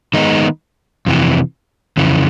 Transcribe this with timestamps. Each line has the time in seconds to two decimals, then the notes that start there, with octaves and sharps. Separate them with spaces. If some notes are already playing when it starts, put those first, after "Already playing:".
0.14 D#3 G#3 B3 D#4
1.06 F2 C3 E3
1.97 F2 C#3 E3